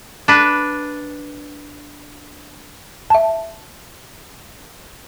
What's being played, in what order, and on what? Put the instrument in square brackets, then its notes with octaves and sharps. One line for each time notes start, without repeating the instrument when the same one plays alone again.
[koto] D4 B4
[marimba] E5 A5